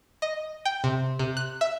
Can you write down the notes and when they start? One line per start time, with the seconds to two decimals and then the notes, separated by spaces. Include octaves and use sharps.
0.22 D#5
0.65 G5
0.84 C3
1.19 C3
1.37 F#6
1.61 E5